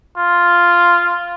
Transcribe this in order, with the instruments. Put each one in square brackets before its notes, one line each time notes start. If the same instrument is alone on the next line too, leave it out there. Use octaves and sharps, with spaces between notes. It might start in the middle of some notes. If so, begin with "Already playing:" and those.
[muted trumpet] F4